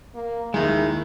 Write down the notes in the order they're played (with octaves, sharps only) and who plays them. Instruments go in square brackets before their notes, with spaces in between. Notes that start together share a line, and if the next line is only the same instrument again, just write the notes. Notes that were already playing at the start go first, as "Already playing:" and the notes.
[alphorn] A#3
[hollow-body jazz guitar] D#2 G#3 [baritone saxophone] D#3 [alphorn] E4